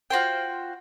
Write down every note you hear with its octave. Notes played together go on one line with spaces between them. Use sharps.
F4 F#4 C5 G5